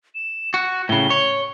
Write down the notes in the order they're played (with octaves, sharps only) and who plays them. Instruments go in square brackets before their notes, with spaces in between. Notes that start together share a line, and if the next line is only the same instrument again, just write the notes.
[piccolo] E7
[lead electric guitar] F#4 [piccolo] F#6
[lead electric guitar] A2 C#3 [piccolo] G7
[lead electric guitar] C#5